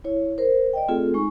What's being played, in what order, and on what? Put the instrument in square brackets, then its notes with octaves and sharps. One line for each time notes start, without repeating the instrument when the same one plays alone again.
[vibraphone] E4 C#5
A#4 C5
D5 D#5 G5
A3 C4 F4 G#4 A4
G#3 D#4 C#6